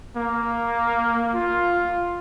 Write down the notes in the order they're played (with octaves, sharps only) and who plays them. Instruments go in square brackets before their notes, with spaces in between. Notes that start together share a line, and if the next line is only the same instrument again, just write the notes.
[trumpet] A#3
F4